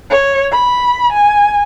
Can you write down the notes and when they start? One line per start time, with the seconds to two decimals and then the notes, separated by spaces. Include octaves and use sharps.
0.11 C#5
0.52 B5
1.13 G#5